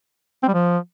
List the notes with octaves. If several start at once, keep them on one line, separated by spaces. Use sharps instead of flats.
C4
G3
F3